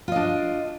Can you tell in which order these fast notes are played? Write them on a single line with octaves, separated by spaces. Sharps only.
F4 D#5 D4